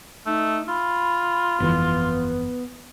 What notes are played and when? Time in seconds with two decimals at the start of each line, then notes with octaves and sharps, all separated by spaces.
0.26 A3 D#4
0.68 F4 B5
1.60 G1 F2 E3 B3